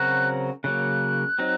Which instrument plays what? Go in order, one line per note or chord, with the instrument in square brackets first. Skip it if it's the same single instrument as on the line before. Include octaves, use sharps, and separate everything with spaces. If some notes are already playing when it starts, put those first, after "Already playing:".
Already playing: [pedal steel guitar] C#3 F#3 C4 F#4 A#4 [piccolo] F#6
[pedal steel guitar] C#3 F#3 A#3 [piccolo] F#6
[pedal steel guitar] F#3 C4 D#4